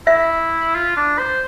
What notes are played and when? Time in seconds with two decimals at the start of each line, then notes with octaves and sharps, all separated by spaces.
0.07 E4 E5
0.74 F4
0.97 D4
1.19 C5